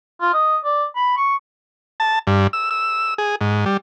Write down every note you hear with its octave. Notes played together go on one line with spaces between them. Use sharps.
F4
D#5
D5
B5
C#6
A5
G2
E6
E6
G#4
G#2
G3